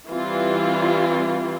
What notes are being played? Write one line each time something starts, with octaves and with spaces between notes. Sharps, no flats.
E3 G3 C4 F4